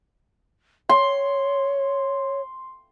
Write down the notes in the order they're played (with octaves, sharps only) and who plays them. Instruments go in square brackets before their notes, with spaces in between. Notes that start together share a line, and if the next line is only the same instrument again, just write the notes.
[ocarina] C#5 [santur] C6